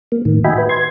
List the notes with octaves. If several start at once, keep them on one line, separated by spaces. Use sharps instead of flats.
A#3
A2 D#3
F#4 D#5 E5 G5 G#5 B5
B4
C6 G#6